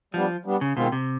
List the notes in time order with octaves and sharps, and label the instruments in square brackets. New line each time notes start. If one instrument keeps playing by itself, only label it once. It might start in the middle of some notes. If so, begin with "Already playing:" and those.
[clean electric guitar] F3 [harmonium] G3 B3 D4
[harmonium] G3 B3 D4
[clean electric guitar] C#3
[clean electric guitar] B2 [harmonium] D#3 G#3 C4 F4
[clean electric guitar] C3